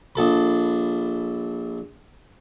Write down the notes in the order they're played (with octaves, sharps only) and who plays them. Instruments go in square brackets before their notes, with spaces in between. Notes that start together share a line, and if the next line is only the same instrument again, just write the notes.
[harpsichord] A#1 A4 B5